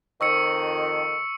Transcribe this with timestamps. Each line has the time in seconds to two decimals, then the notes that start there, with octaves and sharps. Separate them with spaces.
0.21 F2 D#3 C#6 E6 C#7